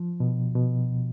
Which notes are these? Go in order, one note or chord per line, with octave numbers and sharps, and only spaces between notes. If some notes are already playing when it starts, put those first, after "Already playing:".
Already playing: F3
B2
B2